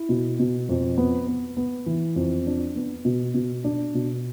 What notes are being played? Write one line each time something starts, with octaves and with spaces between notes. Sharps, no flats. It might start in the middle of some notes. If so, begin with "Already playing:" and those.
Already playing: E4
B2
B2
F2
B3
B3
B3
E3
F2
D4
B3
B2
B2
D4
B2